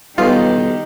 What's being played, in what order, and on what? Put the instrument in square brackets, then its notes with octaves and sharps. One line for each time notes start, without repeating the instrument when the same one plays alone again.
[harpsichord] B1 G2 G#4 [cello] D#3 G4 [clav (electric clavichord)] F4